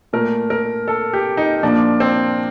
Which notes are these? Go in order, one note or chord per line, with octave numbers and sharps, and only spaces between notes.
A#2 A3 A#4
A#4
A4
G4
D#4
A#2 F3 A#3 D4
C4